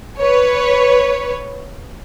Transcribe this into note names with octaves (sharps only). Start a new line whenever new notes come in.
B4 C#5